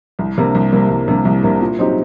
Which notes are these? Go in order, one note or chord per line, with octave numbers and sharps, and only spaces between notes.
C2
C3 G3 A#3
C2
C3 G3 A#3
C2
C3 G3 A#3
C2
C3 G3 A#3
A#2
F#3 C4 D#4 G4